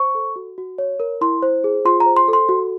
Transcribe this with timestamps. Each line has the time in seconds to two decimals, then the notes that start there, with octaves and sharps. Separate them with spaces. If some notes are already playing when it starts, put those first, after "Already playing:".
Already playing: C5 C#6
0.15 A4
0.36 F#4
0.58 F#4
0.78 C#5
1.00 A#4
1.21 E4 C6
1.42 C5
1.64 G#4
1.85 F4 C6
2.00 A#5
2.06 C5
2.17 C6
2.28 A4
2.33 C6
2.49 F#4